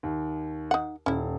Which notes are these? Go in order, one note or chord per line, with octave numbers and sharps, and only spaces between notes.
D#2
D#4 F#5
D#1 C#4 E4